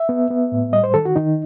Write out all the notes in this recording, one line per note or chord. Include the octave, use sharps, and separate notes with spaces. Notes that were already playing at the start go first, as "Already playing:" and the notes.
Already playing: E5
B3
B3
A2
G3 D#5
C5
D#3 A4
F#4
D#3 D#4